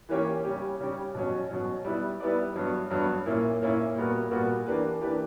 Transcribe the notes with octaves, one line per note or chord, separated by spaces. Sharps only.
E3 A#3 C#4 G4 C#5
C#3 G3 C#4 G4
C#3 G3 C#4 G4
B2 F#3 C#4
B2 F#3 C#4
G3 B3 E4 B4 D5
G3 B3 E4 B4 D5
G2 F#3 B3
G2 F#3 B3
A#2 A#3 C#4 E4
A#2 A#3 C#4 E4
A#2 G3 B3 F#4 A#4
A#2 G3 B3 F#4 A#4
E3 A#3 D4 G4 B4
E3 A#3 D4 G4 B4